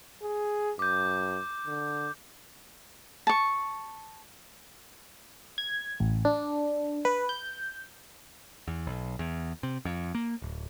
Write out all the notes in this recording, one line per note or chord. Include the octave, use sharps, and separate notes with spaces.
G#4
F#2 D6 G6
D3
A5 C#6
G#6
A1
D4
B4
G6
E2
B1
E2
C3
F2
A#3
D1